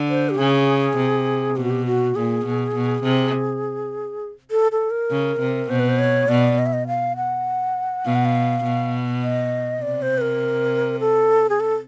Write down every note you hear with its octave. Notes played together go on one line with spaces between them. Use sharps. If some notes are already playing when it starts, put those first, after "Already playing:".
Already playing: D3
C5
G4
C#3 G#4
C3
B2 G4
F#4
G4
F#4
A#2 G#4
B2
B2
C3
A4
A4
A#4
C#3
C3
B2 C5
B4
C5
C#5
B2 D5
D#5
E5
D#5
F5
F#5
B2 F5
F#5
F5
B2
D#5
C3 D5
C5
B4
A#4
A4
G#4
A4